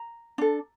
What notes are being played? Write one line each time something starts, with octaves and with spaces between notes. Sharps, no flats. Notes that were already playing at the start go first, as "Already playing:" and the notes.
Already playing: A#5
D4 A4